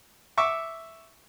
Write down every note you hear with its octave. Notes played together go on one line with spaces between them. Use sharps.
E5 C#6 D6